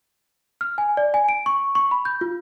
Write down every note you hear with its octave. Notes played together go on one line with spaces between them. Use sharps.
F6
G#5
D5
G#5
D7
C#6
C#6
B5
G6
F4